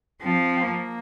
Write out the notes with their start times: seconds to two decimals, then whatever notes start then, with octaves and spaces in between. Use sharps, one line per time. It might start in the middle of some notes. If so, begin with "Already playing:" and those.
0.22 F3 C4
0.62 A#3